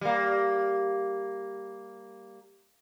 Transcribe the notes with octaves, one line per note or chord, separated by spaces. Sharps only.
G3 A#3